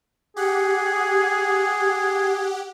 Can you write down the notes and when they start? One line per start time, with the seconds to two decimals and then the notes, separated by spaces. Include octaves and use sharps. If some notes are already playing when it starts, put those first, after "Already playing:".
0.36 G4 G#4 F#5